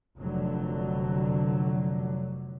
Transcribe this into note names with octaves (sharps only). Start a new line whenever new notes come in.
F1 F2 D3 F#3